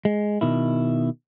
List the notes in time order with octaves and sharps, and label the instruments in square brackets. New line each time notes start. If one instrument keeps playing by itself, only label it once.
[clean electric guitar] G#3
B2 D#3 E4